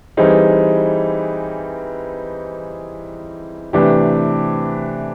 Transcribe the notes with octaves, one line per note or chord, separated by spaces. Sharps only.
E3 G3 C4 D#4 G#4
C3 E3 A3 D4 G4